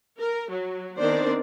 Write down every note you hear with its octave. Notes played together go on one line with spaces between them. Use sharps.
A#4
F#3
D#3 B3 C4 D4 C5 D5